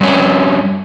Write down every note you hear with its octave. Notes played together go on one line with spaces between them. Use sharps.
G2 C#4